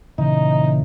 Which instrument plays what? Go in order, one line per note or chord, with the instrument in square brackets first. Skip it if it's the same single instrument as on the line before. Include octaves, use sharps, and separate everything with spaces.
[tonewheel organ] A#2 C#3 E3 [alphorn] D#4